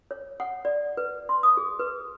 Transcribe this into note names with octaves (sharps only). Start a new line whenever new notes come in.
C#5
F#5
D5
B4
C6
D#6
G#4
B4